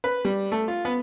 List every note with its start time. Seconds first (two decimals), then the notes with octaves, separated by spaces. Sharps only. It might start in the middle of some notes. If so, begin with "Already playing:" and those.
0.04 B4
0.25 G3
0.52 A3
0.68 F4
0.85 B3